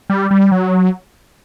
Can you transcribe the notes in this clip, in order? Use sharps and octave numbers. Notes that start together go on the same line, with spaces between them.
G3
G3
F#3